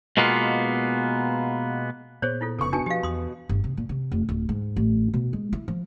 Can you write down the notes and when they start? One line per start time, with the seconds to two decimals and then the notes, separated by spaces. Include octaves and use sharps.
0.17 B2 G#3 A#3 B3 F4
2.22 A#2 B3 G#4 C5 C#5
2.41 E4 F4 A4
2.59 F1 C#3 B3 A4 C6 C#6
2.73 B2 D4 G#5 A5 C#7
2.86 F3 G4 F5
3.03 E2 C6 D#6
3.49 G1
3.64 C3
3.77 A#2
3.89 C3
4.12 F1
4.29 D1
4.49 G#2
4.76 A1
5.14 B2
5.33 G#3
5.53 E4
5.68 F3